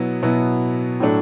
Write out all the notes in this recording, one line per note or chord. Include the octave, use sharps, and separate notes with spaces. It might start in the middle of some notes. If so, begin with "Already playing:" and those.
Already playing: B2 F#3 B3 E4
B2 F#3 B3 E4
A2 F#3 A3 D4